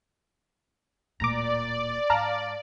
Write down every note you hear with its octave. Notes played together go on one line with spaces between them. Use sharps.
D1 A#2 D5 A#5 D6
G#2 F5 A5 A#5